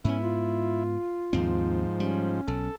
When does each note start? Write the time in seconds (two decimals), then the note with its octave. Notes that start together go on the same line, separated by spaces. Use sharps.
0.05 G#2 B3 C#4 E4
0.21 F4
1.33 D#2 G#2 F3 C4
2.00 G3 C#4
2.48 B1 A4